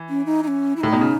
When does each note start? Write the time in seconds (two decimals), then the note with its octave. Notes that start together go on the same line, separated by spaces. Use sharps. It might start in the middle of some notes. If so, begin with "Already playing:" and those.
Already playing: E3
0.09 C#4
0.26 D#4
0.43 D#4
0.48 C#4
0.76 E4
0.81 A2 D#4
0.93 B2
1.01 C#3